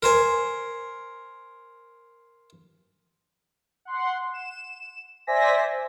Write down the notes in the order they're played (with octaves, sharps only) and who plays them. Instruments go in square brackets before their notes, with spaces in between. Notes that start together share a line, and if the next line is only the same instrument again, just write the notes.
[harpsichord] A#4 C5 G#5
[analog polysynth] F#5 C6
E7
C5 D5 E5 G#5 A#6 B6